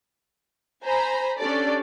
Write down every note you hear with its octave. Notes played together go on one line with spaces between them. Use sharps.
C5 G#5 A#5 B5
C#4 D4 G4 A4 D5